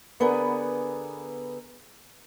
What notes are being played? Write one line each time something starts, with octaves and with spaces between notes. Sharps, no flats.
D3 B3 G#4 A#4 B4